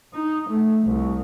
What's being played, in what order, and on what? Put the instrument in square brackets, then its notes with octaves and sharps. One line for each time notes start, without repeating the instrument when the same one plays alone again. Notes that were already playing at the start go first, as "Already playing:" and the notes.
[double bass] D#4
A3
C2